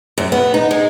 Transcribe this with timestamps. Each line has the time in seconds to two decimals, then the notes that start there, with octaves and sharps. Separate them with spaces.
0.18 F#2
0.32 B3
0.54 D#4
0.71 G#3